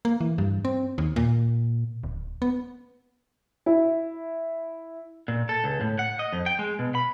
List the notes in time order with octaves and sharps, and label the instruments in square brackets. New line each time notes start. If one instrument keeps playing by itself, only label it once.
[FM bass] A#3
E3
G2
C4
D#2
A#2
D1
B3
[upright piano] E4
[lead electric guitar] A#2
A4
C#2
A2
F#5
D#5
F2
G5
G#3
B2
B5